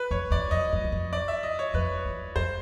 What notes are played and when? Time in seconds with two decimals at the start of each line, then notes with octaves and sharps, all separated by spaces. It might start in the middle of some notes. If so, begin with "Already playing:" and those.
Already playing: B4
0.11 F2 C#5
0.31 E2 D5
0.51 F2 D#5
0.73 F2
0.84 E2
0.92 F2
1.13 D5
1.28 E5
1.43 D#5
1.59 C#5
1.74 F2 B4
2.05 E2
2.36 F2 C5